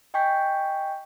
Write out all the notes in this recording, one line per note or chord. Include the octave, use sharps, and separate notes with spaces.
D#5 G5 G#5 C#6 G6 B6